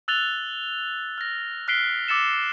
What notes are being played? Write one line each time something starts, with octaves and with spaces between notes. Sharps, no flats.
E6 F#6 A6 F7 G7
F6 A#6
F6 F#6 B6 C7 D7 G7
D6 E6 A6 C#7 E7